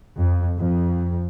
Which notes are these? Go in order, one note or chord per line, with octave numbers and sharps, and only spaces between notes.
F2
F2